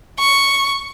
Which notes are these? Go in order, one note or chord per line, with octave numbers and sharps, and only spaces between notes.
C#6